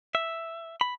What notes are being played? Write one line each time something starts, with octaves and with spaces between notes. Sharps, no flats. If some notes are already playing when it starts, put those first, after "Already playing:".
E5
B5